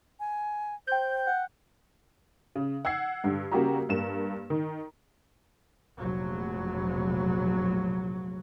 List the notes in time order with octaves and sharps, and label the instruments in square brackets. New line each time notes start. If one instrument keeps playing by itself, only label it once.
[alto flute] G#5
[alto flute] C5 [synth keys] G5 G6
[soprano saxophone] F#5
[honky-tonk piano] C#3
F#5 E6 G#6 C7
G2 D3
C#3 G3 A#3 F#4 G4 A#5
G2 A#3 E7
D#3
[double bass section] F1 A#1 F#3